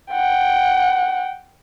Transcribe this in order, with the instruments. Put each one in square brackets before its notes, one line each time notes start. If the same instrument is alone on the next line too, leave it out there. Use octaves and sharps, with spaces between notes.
[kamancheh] F#5 G5